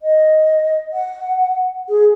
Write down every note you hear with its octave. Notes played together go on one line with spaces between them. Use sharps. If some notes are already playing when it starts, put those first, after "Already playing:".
D#5
F#5
G#4